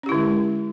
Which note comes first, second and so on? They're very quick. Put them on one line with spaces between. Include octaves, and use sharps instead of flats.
C#4 G4 E4 D3 G#3